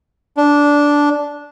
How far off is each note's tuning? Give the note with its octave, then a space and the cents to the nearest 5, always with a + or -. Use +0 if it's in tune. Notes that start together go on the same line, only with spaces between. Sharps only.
D4 -10